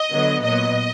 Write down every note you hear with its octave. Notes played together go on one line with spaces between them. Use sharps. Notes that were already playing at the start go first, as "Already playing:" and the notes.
Already playing: D#5
D3 F#3 B3
A#2 F#3 B3 D#5